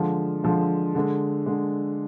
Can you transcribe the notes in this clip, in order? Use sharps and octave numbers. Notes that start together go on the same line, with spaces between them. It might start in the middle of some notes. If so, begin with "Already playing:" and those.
Already playing: D3 F3 G#3
D3 F3 G#3
D3 G#3
D3 G#3